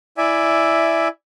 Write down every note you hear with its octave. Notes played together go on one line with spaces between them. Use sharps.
E4 D5 E5 G#5